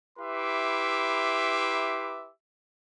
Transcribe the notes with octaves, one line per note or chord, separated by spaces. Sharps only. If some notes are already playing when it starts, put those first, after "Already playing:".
E4 G4 B4 E5 C6 D6